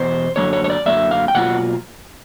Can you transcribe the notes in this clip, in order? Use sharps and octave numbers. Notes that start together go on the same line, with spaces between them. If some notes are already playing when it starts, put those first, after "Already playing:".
Already playing: E2 B2 C5
F#2 D3 F#3 A#3 C#5
C#5
C#5
D5
F#2 D3 F#3 A#3 E5
F5
G5
B2 F#3 A#3 F4 F#5